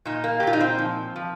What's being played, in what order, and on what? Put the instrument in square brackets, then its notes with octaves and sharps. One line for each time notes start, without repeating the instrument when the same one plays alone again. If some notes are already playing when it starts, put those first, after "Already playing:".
[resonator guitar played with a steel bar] A#2 D#4
A#3
G4
A#2 F4
D#4
C4
F3
F3